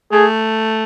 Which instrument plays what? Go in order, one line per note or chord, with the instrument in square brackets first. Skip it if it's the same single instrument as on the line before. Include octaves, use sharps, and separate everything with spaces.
[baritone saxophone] A3 [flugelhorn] G#4